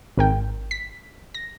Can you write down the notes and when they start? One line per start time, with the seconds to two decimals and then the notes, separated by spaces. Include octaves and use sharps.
0.17 G#1 A#4 G5
0.71 B6
1.34 A#6